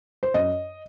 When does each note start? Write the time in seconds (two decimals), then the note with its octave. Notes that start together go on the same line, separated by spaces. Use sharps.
0.23 C5
0.34 F#2 D#5